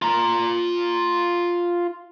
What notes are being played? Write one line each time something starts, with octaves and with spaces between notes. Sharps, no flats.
F4 A#5